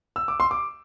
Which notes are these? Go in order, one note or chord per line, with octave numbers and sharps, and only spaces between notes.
E6
D6
C6
D6